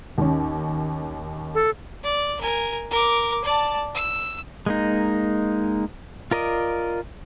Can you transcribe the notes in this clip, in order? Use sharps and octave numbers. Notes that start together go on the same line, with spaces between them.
D#2 C#4
A4
D5
A#4 G#5
A#4 D6
D5 A5
E6
G#3 A#3 D#4
F4 A#4 D5 D#5